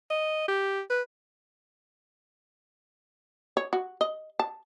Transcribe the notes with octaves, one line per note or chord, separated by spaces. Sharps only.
D#5
G4
B4
C#5
F#4
D#5
A5